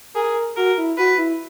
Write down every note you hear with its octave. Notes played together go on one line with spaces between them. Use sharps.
G#4 A#4
F#4 A#4
E4
F#4 B4
E4